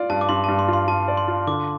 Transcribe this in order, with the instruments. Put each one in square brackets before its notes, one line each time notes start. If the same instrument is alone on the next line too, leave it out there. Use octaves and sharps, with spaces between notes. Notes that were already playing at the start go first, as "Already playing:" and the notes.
Already playing: [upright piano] F4 D5
[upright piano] G2 [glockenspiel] A5
[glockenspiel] D6
[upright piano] G2 [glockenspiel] C6
[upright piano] G2 [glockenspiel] A5
[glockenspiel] C6
[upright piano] F4
[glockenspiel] C6
[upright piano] F4 [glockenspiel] A5
[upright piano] D5
[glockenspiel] C6
[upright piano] F4
[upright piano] D3 [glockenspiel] D6